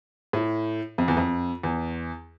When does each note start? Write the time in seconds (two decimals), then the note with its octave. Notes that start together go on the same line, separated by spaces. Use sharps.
0.33 A2
0.98 F2
1.08 E2
1.17 F2
1.63 E2